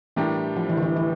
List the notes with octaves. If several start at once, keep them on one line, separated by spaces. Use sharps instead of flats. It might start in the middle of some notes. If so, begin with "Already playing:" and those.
A2 E3 G3 D4 G4 A#4
F3
E3
D3
E3
E3